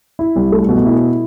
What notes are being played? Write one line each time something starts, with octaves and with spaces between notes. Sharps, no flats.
E4
C2
A3
B2
E4